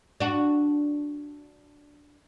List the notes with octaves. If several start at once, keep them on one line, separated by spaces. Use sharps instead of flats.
D4 F#4